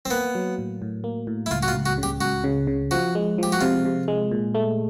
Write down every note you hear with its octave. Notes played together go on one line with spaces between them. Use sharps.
C4
A#3 B3
F#3
A2
A2
A#3
A2
E4
C#2 F4
F#4
F4
C#2
F#4
C#3
G4
C#2 F#4
C#3
C#3
F3 F#4
G#3
F3 G4
F#4
C3 F4
C3
G#3
A#2
A3